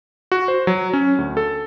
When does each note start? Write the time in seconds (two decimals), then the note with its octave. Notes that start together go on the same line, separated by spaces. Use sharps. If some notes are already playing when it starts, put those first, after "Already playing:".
0.32 F#4
0.48 C5
0.67 F#3
0.93 C#4
1.18 D2
1.37 A4